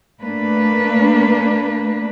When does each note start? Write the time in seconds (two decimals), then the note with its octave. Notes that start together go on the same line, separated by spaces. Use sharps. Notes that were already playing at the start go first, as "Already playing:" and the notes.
0.22 A3 A#3 D4 B4